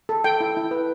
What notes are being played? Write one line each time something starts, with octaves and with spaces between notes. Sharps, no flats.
A4
A4 G5
E4
E4
B4